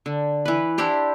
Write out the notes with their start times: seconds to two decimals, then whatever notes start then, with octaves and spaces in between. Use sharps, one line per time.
0.06 D3
0.45 E3 B4
0.78 D4 E4 G4 C5